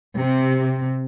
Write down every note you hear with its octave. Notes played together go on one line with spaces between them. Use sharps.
C3